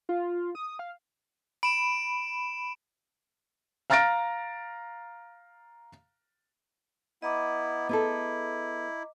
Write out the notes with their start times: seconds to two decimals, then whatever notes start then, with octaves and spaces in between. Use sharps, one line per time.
0.09 F4
0.55 D#6
0.79 F5
1.63 B5 D7 E7
3.90 F5 A#5 F6 A6 A#6 D7
7.22 B3 E4 D#5 A#5 D6
7.89 B3 E4 G#4 A4